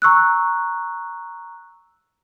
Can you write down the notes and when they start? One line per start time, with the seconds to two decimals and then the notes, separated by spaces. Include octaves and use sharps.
0.02 A#5 C#6 E6 F#6